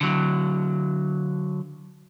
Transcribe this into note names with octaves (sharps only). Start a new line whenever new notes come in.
D3 F#3